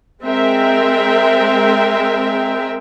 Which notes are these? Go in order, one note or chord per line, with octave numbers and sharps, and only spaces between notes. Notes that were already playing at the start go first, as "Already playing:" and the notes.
G#3 C4 A#4 E5 G5